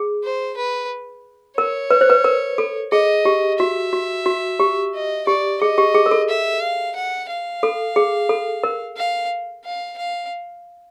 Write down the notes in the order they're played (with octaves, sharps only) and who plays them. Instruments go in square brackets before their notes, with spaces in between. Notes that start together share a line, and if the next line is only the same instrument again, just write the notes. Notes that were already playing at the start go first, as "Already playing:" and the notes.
Already playing: [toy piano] G#4
[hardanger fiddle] C5
B4
[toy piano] A#4 [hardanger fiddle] C#5
[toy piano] B4
C5
B4
A#4
A4
[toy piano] G#4 [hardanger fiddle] D#5
[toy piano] G4
[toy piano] F#4 [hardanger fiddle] E5
[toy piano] F#4
F#4
G4
[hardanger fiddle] D#5
[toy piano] G4 [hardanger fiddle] D5
[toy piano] G#4 [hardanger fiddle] D#5
[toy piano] G4
G#4
A#4
A4
[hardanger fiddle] E5
F5
F#5
F5
[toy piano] A4
G#4
A4
A#4
[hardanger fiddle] F5
F5
F5